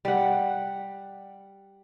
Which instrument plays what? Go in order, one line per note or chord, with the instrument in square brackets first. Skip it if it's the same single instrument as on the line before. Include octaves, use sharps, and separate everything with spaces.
[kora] G3 F#5